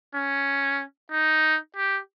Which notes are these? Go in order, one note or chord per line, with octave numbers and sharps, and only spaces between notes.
C#4
D#4
G4